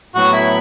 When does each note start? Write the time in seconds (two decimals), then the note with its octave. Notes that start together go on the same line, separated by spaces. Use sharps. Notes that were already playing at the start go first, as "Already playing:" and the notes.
0.14 A2 F#3 B3 F#4
0.33 E4